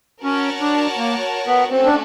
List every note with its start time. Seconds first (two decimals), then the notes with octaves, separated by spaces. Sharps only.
0.24 C#4 F#4 A#4 C#5 F#5 A5
0.61 D4
0.98 A#3
1.47 B3
1.71 A3 C4 C#4 F#4 A4
1.85 D4